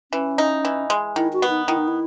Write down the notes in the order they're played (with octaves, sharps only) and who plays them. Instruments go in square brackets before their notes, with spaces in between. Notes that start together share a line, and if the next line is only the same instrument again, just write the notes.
[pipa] E3 [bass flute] C#4
[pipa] D#4
E3
G#3
[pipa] D#3 [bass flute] E4
[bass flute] F#4
[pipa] B3
[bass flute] D#4
[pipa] D#3 [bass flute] E4
[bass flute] D#4
E4